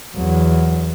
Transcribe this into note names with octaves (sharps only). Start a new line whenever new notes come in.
E2 F#3